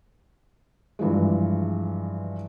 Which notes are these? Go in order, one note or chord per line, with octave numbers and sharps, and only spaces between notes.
G2 E3 F3 G#3